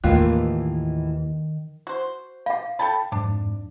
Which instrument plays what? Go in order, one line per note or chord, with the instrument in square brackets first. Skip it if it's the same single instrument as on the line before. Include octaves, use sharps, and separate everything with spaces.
[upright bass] D#2 [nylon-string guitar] A2 E3 F4 [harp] D#3 [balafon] A#3
[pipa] F#4 C5
[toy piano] F5 F#5
[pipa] A4 G5 A5 [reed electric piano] B5
[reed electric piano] F2 G#2 [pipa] D4